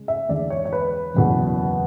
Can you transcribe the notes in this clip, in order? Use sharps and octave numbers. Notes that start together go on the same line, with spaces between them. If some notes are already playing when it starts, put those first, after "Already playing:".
Already playing: C#3 G#3
E5
E2 D3 G#3 D5
C#5
C#5
B4
F#1 E2 B2